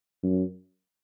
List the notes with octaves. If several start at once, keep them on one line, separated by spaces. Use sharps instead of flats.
F#2